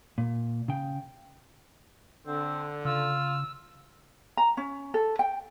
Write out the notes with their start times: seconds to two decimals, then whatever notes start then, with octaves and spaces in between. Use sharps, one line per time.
0.18 A#2
0.68 C#3 G5
2.27 D3 C4
2.85 C#3 F4 E6
4.37 A#5
4.57 C#4
4.94 A4
5.19 G5